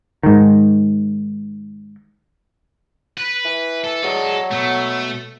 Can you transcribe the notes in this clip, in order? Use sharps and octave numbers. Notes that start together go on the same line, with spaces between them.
G#2 D#3
B4
E3
A4
F#3 G#4 D5 D#5
B2 A3